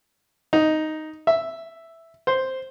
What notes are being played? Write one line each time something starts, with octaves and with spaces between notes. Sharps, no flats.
D#4
E5
C5